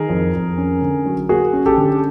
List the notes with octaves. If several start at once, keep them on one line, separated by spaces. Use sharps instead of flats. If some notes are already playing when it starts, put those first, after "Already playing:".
Already playing: D#3 G#4 A#4
F2
F2
C#4
D3
F#3
A#3 F#4 G#4
C#4
G4 A4
D3